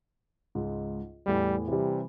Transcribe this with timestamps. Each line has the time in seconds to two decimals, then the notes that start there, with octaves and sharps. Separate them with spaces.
0.55 C#2 G#2
1.26 E2 A2 E3 G3
1.68 C3 E3 G3